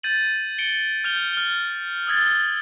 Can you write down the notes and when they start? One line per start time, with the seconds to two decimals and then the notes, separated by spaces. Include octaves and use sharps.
0.03 G6 A6 D#7 F#7
0.58 C#7 D7 G7
1.04 F6 G6 F7 G7
1.33 F6 G7
2.07 D#6 E6 G#6 A6